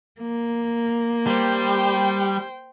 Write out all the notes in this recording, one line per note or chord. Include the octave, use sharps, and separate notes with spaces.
A#3
G3 C5 G5